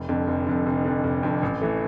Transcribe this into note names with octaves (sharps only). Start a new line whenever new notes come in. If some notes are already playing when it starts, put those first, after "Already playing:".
Already playing: F1
F2 D3
F1
F2 D3
F1
F2 D3
F1
F2 D3
A1
E3 A3